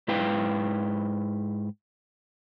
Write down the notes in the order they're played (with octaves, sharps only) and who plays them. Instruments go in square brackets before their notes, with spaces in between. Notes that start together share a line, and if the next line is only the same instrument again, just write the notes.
[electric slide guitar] G#2 E4 B4 F5 G5